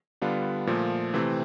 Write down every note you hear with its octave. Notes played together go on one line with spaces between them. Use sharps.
D3 G3 B3 D4 F4
A#2 F3 A3
C3 E3 A3 C4